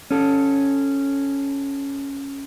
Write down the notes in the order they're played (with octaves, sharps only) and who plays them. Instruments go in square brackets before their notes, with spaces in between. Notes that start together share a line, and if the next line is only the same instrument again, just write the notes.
[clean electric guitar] C#4 A4